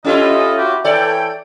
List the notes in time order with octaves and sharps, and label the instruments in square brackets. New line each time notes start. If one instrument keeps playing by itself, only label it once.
[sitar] C#4 E4 F4 [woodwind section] G4 A4 D#5
[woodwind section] F#4 G4
[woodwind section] E3 C#5 G5 [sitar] A4 D5